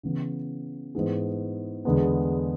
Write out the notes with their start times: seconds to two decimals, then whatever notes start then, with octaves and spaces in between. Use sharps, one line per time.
0.03 C#3 E3 B3
0.95 G#2 E3 B3 E4 G#4
1.85 E2 D3 G#3 B3